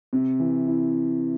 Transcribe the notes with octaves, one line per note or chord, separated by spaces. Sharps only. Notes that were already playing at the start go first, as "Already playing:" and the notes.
C3
E3
E4